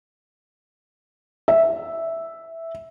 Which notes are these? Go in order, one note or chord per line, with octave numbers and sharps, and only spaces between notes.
E5